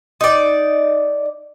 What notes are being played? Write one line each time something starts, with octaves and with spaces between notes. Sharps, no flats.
D#4 D5